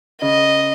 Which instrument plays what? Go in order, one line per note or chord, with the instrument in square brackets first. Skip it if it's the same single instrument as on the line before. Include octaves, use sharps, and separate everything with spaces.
[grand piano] C#3 [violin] D#5